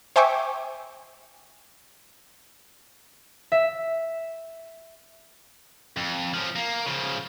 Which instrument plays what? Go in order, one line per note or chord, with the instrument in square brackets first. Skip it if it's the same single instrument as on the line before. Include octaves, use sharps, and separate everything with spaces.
[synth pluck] C5 E5 G5 G#5 C#6 D6
[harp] E5
[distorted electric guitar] F2
F3 C#4
A#3
C#3 F3